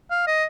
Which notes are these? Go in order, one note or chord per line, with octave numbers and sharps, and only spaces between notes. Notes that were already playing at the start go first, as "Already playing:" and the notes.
F5
D#5